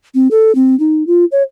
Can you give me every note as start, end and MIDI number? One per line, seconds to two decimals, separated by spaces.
0.15 0.28 60
0.31 0.54 69
0.55 0.78 60
0.80 1.06 63
1.07 1.25 65
1.32 1.43 73